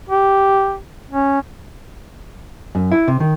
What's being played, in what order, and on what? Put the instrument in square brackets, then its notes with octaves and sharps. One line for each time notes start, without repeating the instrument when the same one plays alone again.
[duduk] G4
C#4
[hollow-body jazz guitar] F#2
E4
C3
D#3